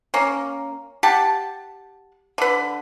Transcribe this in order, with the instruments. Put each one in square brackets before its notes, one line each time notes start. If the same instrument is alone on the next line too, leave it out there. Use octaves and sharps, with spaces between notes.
[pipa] A#3 C#4
G4 F#5 A5
D3 B4